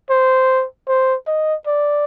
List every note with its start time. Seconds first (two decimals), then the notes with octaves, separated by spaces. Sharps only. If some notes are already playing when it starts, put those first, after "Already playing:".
0.10 C5
0.88 C5
1.27 D#5
1.67 D5